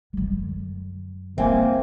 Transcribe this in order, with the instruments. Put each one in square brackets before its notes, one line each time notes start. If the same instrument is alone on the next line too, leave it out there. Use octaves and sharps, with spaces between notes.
[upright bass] F#2 D3
[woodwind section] A#3 [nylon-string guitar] C4 [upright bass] E4 F4 [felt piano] E5 G#5